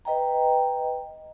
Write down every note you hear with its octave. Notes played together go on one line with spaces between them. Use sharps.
B4 D#5 G5 A#5